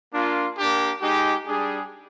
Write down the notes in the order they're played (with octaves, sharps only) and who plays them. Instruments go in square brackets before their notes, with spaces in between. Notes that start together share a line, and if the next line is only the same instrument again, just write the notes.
[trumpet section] A#3 D4 F4
A#3 D4 G4
G#3 D#4 G4
G3 D4 G#4